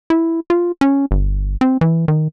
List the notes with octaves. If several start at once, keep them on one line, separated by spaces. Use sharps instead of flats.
E4
F4
C#4
G1
C4
E3
D#3